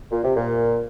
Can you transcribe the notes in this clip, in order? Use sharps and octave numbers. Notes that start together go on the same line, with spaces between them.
A#2
C3
A#2